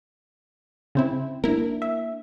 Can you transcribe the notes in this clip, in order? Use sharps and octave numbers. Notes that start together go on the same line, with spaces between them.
C#3 C4 E4
A#3 D4 E4 A#4
E5